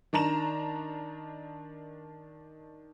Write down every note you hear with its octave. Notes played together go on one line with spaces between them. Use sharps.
D#3 D4 A#5 E7